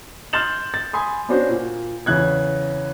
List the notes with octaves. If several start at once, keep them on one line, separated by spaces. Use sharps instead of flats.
C6 F6 G6 A6 E7 F#7
A6
G#5 B5 C6 D#6
B3 C#4 D4 F#4 C5
A#2
E2 C#3 F#6 G#6